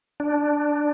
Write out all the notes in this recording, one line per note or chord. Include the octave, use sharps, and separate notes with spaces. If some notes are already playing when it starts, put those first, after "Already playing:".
D4